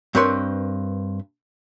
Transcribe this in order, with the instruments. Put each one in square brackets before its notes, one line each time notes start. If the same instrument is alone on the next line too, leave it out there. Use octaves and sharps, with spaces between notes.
[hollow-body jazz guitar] G2 C4 A#4 B4 C#5 C6